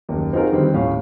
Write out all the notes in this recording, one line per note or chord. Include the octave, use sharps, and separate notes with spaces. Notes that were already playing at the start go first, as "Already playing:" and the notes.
F#1 D#2
C4 D#4 F4 F#4 G#4 A#4
F2 D3 D#3 G3 C4
D#1 A2 C#4 F5